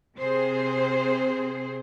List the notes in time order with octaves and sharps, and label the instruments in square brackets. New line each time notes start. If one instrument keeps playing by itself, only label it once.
[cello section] C3 C4 G#4 C5